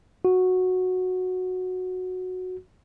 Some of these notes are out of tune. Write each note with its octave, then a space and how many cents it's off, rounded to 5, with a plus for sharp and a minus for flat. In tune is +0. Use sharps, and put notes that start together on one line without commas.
F#4 -10